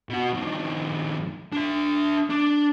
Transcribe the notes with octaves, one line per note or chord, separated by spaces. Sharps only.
B2 F#4
G2 D#3
D4 E5
D4